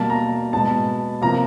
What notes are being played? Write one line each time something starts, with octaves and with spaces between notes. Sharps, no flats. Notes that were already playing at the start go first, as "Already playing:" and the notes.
Already playing: B2 G3 A#3 A5
A#5
B2 G#3 B3 A5
C3 F3 A#3 A#5